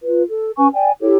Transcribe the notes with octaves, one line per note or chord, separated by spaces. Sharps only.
F4 B4
A4
C#4 B4 G#5 C#6
D5 G5 G#5
E4 G4 A4 C#5